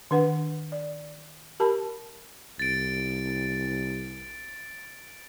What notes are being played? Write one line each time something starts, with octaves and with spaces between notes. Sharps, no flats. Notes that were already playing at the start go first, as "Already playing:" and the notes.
D#3 D4 B4 F#5
D5
G4 A#4 A5 B5
C2 A6 D7